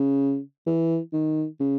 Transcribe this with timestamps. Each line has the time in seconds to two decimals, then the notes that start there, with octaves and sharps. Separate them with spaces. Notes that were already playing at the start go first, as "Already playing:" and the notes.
Already playing: C#3
0.67 E3
1.13 D#3
1.59 C#3